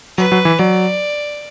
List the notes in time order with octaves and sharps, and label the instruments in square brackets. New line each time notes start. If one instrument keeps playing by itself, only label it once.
[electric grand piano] F#3 [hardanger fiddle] B4
[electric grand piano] F#3
E3
[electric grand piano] F#3 [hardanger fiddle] D5